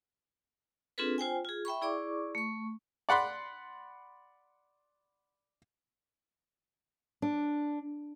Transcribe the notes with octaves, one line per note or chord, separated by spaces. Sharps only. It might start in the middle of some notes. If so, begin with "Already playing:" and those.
C4 D4 F4 G#4 A4 B4
F4 C5 G5 G#5
F4 G#4
E5 G5 B5 C#6
E4 G#4 D5 C#6 D6
A3 C#6
D5 F#5 B5 C6
D4